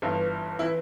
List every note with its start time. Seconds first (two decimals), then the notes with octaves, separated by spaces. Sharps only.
0.02 G1 G2 E3
0.59 E3 E4